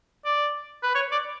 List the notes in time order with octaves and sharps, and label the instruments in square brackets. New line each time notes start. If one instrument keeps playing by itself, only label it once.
[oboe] D5
B4
C#5
D5